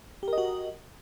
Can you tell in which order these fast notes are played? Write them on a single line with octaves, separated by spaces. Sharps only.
G4 A#4 D#5 F#4